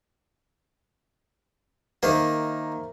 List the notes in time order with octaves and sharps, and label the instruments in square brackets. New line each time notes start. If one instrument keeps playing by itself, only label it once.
[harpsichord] D#3 A#3 [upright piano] A#4 C5 E5